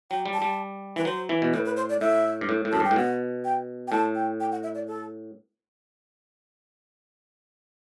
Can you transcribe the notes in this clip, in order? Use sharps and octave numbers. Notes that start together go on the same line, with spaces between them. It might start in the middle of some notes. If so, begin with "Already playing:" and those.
F#3 G5
G3
A5
G3
E3 B4
F#3 C5
E3
B2
A2 B4
B4
C5
D5
A2 E5
G2
A2
A2
F#2 A5
G2 G5
A2
B2 F#5
G5
G5
A2 A5
G5
G5
F#5
E5
D5
A4